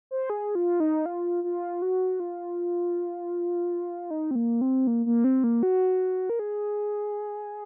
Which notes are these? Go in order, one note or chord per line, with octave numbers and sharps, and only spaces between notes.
C5
G#4
F4
D#4
F4
F4
F#4
F4
D#4
C4
A#3
C4
A#3
A#3
C4
A#3
F#4
A#4
G#4